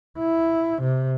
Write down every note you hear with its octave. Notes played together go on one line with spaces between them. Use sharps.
E4
C3